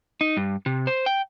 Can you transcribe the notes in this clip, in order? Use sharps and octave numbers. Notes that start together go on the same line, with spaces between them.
D#4
G2
C3
C5
G5